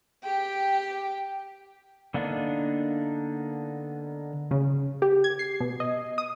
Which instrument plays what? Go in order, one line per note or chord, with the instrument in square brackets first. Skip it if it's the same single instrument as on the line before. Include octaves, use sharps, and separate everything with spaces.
[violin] G4 G5
[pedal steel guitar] D3 A#3 B3 D4 D#4
[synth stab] C#3
G4
G#6
C7
B2
D#5
D#6